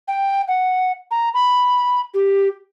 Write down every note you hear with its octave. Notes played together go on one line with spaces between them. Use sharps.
G5
F#5
A#5
B5
G4